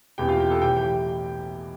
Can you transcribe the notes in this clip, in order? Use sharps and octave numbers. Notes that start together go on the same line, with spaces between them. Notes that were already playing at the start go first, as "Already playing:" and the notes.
E1 E2 C3 E3 G4 G5
F4 F5
G4 G5
A4 A5
B1 A2 E3 G4 G5
G4 G5